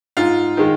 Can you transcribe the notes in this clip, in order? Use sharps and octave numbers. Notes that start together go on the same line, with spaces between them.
G#2 F4
D#3 G#3